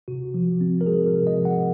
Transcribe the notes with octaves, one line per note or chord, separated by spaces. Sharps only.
C3 F#4
F3
C4
A#4
G#3 G#4
A#4
C3
D#5
F3
F#5